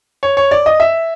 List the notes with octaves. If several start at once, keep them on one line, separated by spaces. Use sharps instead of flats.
C#5
C#5
D5
D#5
E5